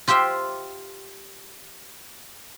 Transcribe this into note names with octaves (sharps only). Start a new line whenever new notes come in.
F4 G4 C5 E5 G5